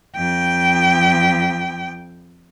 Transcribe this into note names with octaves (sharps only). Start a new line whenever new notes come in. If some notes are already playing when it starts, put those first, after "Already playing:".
F2 G5